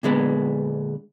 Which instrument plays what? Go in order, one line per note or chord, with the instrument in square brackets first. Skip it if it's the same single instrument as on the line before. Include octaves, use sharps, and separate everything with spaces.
[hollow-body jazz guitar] A#2 D3 G#3 B3